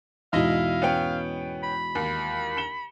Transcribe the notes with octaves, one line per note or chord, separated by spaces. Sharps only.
E2 G#2 B2 D#4 E4 D#5 F5
B3 C#4 G5
B5
D#2
C#7 E7 G7